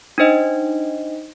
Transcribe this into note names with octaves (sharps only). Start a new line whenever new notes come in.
D4 D#4 C5 D#5